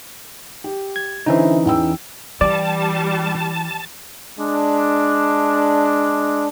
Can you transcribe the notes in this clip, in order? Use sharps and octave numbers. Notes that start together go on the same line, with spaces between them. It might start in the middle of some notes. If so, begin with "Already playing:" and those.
G4
G#6
D3 E3 C#4 D#4 E4 C5
E2 G5 E6
E3 G3 D5 A5
G#3 D4